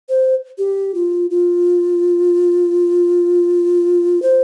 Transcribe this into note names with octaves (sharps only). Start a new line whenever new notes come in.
C5
G4
F4
F4
C5